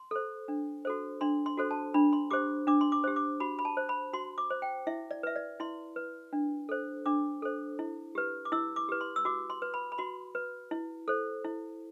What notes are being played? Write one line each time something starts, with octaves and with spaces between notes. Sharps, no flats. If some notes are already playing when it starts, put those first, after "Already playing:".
Already playing: C6
A4 C5
D4
F#4 A4 C5
D4 C6
C6
F#4 A4 C5
A5
D4 B5
C6
G4 C5 D6
D4 D6
C6
D6
G4 C5
D6
F#4 B5
B5
A5
C5
B5
F#4 C6
D6
C5
G5
E4 E5
D5
B4 E5
D5
E4 C6
B4
D4
A4 C5
D4 D6
A4 C5
E4
G4 B4
D6
E4 E6
D6
G4 B4
C6
E6
F#4 D6
C6
B4
B5
B5
F#4 C6
B4
E4
A4 C5
E4